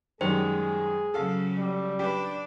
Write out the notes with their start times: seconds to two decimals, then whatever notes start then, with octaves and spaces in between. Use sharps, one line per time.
0.21 F#2 D#3 G3 G#3 G#4 C5
1.14 C#3 F#3 A4 F5
1.58 G3
1.99 D4 G4 B4